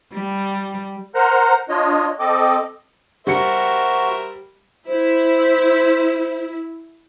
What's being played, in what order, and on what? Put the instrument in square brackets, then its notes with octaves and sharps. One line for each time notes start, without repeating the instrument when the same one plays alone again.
[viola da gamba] G3
[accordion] A#4 C5 F#5 A#5
D4 F4 C#5 D#5
C4 A4 D#5 D6
[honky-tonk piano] G3 C#7 [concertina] F#4 [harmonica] A#4 C5 E5
[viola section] E4 [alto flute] C5